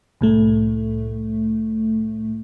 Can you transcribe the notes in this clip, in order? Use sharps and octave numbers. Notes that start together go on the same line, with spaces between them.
C2 A2 A3